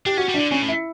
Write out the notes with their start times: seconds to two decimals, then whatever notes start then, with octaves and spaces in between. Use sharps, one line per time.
0.06 D4 G4
0.17 C#4 F#4
0.29 G3
0.34 D4
0.40 D3
0.51 C#3 C#4
0.62 A2
0.68 E4